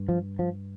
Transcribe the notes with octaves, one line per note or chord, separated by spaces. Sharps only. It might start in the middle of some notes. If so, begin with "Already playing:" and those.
Already playing: G2
F3
F3